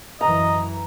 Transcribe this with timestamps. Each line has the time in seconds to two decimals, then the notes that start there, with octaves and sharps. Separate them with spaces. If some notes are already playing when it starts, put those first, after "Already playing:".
0.21 F#2 E3 D#5 A#5